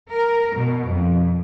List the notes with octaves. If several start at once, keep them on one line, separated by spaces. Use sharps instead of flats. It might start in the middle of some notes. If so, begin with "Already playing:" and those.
A#4
B2
F2